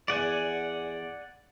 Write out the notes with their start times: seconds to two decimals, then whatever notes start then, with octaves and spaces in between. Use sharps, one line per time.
0.08 E2 D5 F#5 G#5